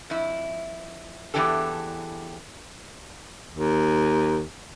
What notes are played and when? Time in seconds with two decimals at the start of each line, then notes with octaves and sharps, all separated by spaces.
0.10 F2 E4
1.34 E2 A#2 E3 D4 G4 A4
3.51 D#2